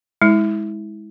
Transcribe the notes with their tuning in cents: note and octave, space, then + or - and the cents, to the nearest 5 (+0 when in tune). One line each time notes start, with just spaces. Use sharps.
G#3 +0 E4 -30